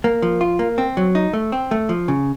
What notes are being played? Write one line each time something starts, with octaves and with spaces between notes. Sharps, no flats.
A#3
F3
F4
A#3
C4
F#3
D#4
A3
C4
A3
F3
C#3